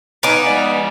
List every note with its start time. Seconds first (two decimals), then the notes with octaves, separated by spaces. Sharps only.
0.23 B3 D#4 F5 G#5 D6
0.47 G#3 D5